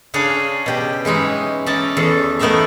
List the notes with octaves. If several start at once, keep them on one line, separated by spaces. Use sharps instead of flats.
C#3 C#4 D4 G#4 F5
B2 G4
E3 G#3 C#4 D#4 E4
C#4 D#4 D5 E5 A5 A#5
E2 A4
A3 B3 D#4 A#4 E5 F5